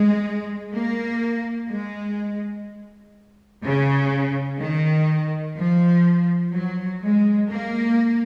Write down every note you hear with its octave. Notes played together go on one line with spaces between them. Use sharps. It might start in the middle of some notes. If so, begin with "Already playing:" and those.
Already playing: G#3
A#3
G#3
C#3
D#3
F3
F#3
G#3
A#3